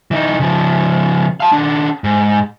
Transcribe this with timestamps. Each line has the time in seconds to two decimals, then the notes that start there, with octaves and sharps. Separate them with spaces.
0.11 E3 D#4
0.40 C#3 F3
1.40 F5 A5
1.53 D#3 D4
2.04 G#2